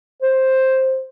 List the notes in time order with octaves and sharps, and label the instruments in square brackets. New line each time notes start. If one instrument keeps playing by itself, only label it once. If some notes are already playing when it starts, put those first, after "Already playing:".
[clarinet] C5